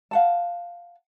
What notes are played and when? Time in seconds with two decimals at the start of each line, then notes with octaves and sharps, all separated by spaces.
0.11 F5 F#5 A5